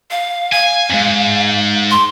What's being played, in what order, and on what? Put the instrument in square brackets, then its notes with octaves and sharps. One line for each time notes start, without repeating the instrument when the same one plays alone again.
[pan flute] F5
[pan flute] F5 [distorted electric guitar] G#5
[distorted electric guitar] F2 G#2
[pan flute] C6